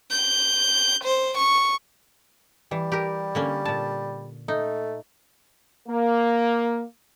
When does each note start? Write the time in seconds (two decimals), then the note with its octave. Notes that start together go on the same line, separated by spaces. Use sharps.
0.10 G6
1.04 C5
1.38 C#6
2.71 E3 G3
2.92 G4 A#4
3.35 D3 A#3 C#4
3.65 A#2 A5
4.48 A3 D#4
5.88 A#3